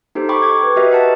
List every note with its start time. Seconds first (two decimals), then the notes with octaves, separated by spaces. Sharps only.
0.15 D#4 G4 A4 C5
0.29 G5 B5 C#6 D6
0.42 C#6 D6 G#6
0.63 B4
0.76 F#4 G4 A#4 B4 D#5 E5
0.91 E5 F#5 A5